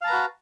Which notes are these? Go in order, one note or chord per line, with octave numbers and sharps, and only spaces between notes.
F#4 B4 F5 A5 A#5